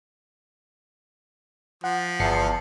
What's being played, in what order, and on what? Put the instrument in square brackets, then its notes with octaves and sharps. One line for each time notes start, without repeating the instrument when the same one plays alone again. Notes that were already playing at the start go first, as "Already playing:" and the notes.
[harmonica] F3 [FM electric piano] F#5
[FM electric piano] G1 C7 C#7 [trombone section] E2 [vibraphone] A5